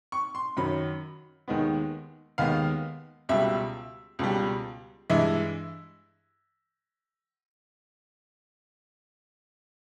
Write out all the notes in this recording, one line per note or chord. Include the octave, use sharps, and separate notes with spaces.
C#6
C6
F#2 D#3 F#3 B5
D#2 D#3 G#3 B3
D#2 D#3 G#3 B3 F5
C#2 B2 G3 E5
C#2 B2 G3
G2 E3 G#3 E5